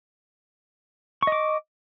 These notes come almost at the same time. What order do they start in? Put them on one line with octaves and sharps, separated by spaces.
C#6 D#5 D6